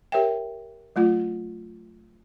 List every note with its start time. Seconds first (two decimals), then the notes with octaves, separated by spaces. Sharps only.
0.12 G4 A#4 C#5 E5 G5
0.96 F#3 A3 F4